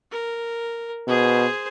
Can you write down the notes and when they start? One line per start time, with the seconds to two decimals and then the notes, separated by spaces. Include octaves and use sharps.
0.11 A#4
1.08 B2 G#4 C5